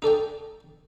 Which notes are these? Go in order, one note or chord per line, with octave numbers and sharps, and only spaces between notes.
D#4 A4 D5 G5